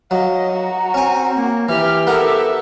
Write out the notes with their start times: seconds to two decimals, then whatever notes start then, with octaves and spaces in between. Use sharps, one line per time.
0.11 F#3 D#5 F5
0.53 F#4 A#5
0.94 C4 C#4 G#5
1.36 A#3
1.69 E3 G4 F6
2.07 B3 A4 A#4 E5